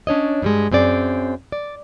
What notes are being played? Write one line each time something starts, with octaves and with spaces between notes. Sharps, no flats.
C#4 D4 C#5 D#5
G2 G3 G#3
F#2 C4 G#4 D5
D5